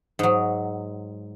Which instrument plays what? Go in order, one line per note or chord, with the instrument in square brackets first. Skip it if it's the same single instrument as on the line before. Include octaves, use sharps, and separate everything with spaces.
[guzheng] G#2 F#3